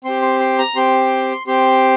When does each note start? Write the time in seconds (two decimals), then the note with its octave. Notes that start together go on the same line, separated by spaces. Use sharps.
0.05 C4 G4 C6
0.22 C6
0.40 C6
0.58 A#5
0.76 C4 G4 C6
1.47 C4 G4 C6